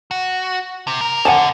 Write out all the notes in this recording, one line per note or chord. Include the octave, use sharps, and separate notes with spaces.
F#4
C3
A#4
F2 D3 F#5 G#5 A5